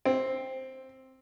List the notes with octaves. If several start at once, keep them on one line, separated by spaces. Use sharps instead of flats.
C4